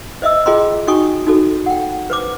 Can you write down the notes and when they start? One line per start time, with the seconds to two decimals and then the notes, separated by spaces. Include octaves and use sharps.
0.22 C5 D#5 E5 E6
0.46 F4 G#4 D#5 G5 A#5 C6
0.87 D#4 F#4 G5 G#5 C#6 D#6
1.27 D#4 F#4 A4
1.66 F#5 G5
2.10 B4 C5 D6